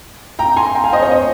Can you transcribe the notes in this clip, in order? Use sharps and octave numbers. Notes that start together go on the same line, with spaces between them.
G5 A#5
G#5 C6
G5 A#5
F5 G#5
C5 D#5
C#5 F5
C5 D#5